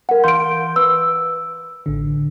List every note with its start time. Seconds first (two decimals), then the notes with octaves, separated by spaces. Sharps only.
0.09 A#4 F#5
0.24 E3 F5 C6 G6 D7
0.76 B4 E6
1.86 A1 D3